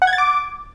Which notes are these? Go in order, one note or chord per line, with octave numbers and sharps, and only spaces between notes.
F#5
G#6
A6
D6